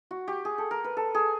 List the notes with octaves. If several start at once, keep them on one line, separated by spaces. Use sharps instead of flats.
F#4
G4
G#4
A4
A#4
B4
A4
G#4